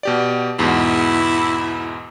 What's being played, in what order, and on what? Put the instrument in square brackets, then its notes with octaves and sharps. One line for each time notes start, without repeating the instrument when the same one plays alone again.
[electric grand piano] B2 G4 D5
[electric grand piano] E2 G#2 B2 [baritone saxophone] E4